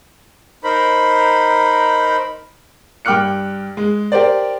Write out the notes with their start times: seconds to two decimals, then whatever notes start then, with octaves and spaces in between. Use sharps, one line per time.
0.64 D#4 A#4 C5 B5
3.05 G2 G5 D6 F6 F#6 C#7
3.77 G#3
4.12 G4 A#4 C5 D5